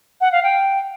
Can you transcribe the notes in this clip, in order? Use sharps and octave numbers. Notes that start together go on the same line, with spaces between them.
F#5
F5
G5